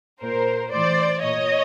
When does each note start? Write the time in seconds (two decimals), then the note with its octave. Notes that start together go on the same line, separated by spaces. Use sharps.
0.21 A#2 A#4 C5
0.71 A2 E3 C5 D5
1.22 A#2 C#5 D#5